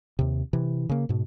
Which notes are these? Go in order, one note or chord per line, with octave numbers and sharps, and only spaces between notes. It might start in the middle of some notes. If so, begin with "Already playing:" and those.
D#2 C3
C3 E3
C#3 A#3
G#2 B2